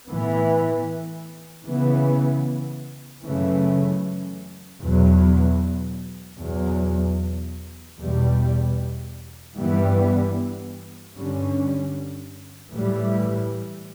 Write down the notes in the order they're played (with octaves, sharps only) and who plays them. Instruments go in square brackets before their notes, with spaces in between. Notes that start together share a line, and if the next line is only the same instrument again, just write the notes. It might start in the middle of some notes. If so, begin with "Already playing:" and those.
[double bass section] A2 E3 B3
C#3 E3 B3
F#2 C#3 E3 A3 C#4
E2 B2 F#3
E2 B2 F#3
E2 B2 G3
G2 E3 G3 B3
G2 D3 G3 C#4
A2 E3 G3